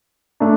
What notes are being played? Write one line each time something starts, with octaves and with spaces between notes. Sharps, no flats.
A3 D4